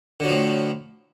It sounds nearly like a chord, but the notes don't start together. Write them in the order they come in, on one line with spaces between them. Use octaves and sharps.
D3 F#3 F3 A2